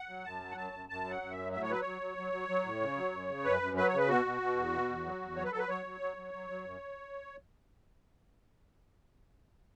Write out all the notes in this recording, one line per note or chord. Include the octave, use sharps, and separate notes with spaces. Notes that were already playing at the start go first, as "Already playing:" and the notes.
Already playing: F#5
F#3
F#2 A5
F#3
F#5
F#2 A5
F#2
F#2 A5
F#3
F#5
F#2
E5
F#3
A2 E5
C#5
F#3 B4
F#3 C#5
F#3
F#3
F#3
F#3
A2
C#3
F#3
F#2
C#3
F#2 B4
F#2
F#3 B4
C#5
C#3 B4
B2 F#4
B2
B2
E2
B2
E2
F#3
E2
F#3 C#5
B4
F#3 A4
B4
F#3 C#5
F#3
F#3
F#3
F#3
F#3
F#2